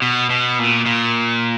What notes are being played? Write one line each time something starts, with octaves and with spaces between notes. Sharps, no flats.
B2
B2
A#2
A#2